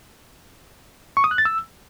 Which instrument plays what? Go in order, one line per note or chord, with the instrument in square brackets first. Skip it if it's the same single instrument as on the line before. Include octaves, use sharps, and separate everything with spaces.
[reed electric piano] C#6
D#6
F#6
A6
E6